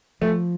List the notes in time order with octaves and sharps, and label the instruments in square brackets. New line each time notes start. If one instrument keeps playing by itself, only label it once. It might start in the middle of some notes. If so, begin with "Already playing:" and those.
[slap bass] F3 [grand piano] A3